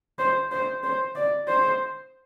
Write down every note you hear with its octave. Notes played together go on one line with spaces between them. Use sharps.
C5
C5
C5
D5
C5